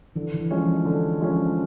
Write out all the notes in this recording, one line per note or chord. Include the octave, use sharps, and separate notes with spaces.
D3 E3
E3
F3 G#3 C#4
D3
F3 G#3 C#4